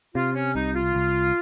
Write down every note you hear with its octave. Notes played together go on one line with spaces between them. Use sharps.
C3 F4
C#4
C2 D#4
F4
C2